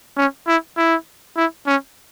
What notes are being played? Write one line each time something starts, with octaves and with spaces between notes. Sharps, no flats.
C#4
E4
E4
E4
C#4